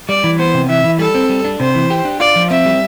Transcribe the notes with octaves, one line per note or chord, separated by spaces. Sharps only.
G3 D5
E3
B3 C5
C3
E3 E5
E3
G3 A4
C4
G3
D4
C3 C5
E3
G4
D4
F4 D5
F3
C4 E5
G3